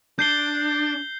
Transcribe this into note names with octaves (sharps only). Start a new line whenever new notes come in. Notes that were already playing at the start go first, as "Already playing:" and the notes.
D4 G6 C7 G7